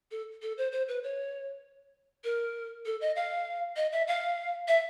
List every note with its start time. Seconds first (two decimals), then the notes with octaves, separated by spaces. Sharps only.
0.11 A4
0.42 A4
0.58 C5
0.72 C5
0.88 B4
1.04 C#5
2.24 A#4
2.86 A4
3.01 D#5
3.16 F5
3.76 D#5
3.92 E5
4.08 F5
4.68 E5